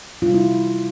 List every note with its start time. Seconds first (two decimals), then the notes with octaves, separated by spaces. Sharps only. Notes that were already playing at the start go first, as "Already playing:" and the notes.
0.22 C3 G3 F4
0.34 E4